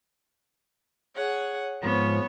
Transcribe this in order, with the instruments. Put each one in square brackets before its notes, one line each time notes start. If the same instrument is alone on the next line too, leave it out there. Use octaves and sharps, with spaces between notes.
[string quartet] G#4 C#5 F#5
[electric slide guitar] G#2 F3 [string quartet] B3 C#5